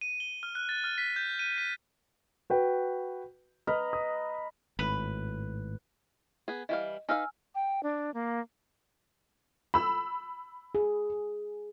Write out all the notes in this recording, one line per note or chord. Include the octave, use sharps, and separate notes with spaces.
D#7
G7
F6
F#6
A6
F6
B6
G6
D#7
B6
F#4 B4 G5
B4 D#5 A#5 F6
D#6
G#1 A2 B4
B3 G#4
E3 G3 D#5 F5
D#4 B4 F5 G#5 E6 F6
G5
D4
A#3
B5 E6
G#4